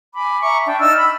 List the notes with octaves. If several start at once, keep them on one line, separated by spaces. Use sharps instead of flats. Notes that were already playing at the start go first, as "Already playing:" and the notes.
G#5 B5 D6
E5 A#5 C#6 D6
D4 G5
D#4 D5 E6 F6
B5